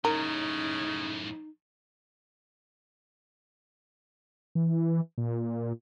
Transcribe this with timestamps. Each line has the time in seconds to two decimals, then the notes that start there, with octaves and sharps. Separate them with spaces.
0.05 F#2 A2 C#3 D#4 A#4
4.55 E3
5.18 A#2